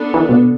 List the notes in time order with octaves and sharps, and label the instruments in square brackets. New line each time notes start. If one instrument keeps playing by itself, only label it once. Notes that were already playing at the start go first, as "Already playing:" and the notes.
Already playing: [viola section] B3 D4 A4
[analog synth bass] E3
B2